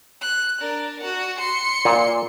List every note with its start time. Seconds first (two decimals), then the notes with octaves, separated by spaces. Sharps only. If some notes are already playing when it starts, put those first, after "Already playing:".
0.21 F#6
0.61 D4 A#4
1.01 F#4 F#5
1.39 C6 C#7
1.85 A#2